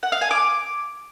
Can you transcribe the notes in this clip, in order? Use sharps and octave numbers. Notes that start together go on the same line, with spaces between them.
F#5
F5
G#5
D6